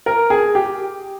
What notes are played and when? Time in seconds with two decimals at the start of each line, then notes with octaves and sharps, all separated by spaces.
0.06 A#4
0.30 G#4
0.55 G4